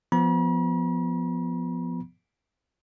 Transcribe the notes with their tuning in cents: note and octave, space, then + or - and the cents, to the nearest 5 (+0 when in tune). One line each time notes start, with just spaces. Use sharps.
F3 +0 B3 +0 B5 -45